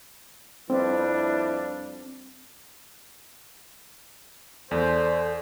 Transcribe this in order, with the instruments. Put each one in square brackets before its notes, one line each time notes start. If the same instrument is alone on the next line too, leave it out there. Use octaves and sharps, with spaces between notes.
[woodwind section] F2 G3 [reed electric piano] C4 [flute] D4 [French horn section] E4 B4
[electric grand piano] E2 [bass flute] A4 [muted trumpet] C5 [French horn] D5